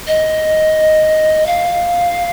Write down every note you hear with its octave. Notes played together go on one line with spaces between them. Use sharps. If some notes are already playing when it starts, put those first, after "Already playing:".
D#5
F5